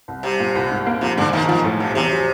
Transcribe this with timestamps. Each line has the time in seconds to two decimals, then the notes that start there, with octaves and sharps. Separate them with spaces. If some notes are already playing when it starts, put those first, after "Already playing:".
0.08 C2
0.23 C3 G3
0.39 A#2
0.55 C2
0.71 G#2
0.86 A#3
1.01 C3 F3
1.17 G#2 D3
1.33 B1 D#3
1.48 D#3 F3
1.64 A2
1.80 B1 C3
1.95 E2 C3
2.11 F#3